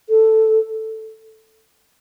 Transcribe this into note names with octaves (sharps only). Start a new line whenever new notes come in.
A4